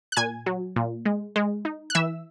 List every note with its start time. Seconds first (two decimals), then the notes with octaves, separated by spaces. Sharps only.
0.12 F#6
0.16 A#2 G#5 G#6
0.46 F#3
0.76 A#2
1.05 G#3
1.36 G#3
1.65 D#4
1.90 F#6
1.95 E3 E5 E6